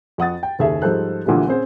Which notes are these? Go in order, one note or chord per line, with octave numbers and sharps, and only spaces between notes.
F2 F#5 D#6 A6
G5
F#1 D#2 G#4 A4 E5
G#2 F3 G3 A4 C5 F#6
A#1 A#2 D3 E3 G3 A3
C4 C#4 G#4 C5